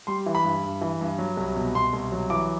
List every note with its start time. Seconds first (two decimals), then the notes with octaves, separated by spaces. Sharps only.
0.07 G3 C6
0.26 E3
0.35 B5
0.44 G2
0.63 G2
0.81 E3
1.01 G2
1.19 F#3
1.37 C2
1.56 B2
1.75 B2 C6
1.93 C2
2.12 F#3
2.30 E3 D6